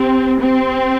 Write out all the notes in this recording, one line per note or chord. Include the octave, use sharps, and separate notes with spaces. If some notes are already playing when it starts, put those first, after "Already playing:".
Already playing: C4 G4
C4